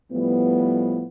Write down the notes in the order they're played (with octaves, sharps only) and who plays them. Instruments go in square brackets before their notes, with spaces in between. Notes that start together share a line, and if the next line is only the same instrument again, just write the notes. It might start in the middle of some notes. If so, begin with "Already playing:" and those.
[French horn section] A2 F3 G3 B3